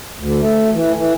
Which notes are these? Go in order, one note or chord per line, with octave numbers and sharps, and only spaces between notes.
D2
A3
E3
E3